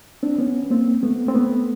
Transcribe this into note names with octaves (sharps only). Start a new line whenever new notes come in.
C4 D4
B3 C#4
A#3 C4
A3 B3
C4
A3 B3